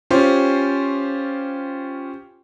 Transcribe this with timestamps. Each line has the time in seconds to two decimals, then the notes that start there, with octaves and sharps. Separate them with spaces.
0.10 C#4 F4 G4 C5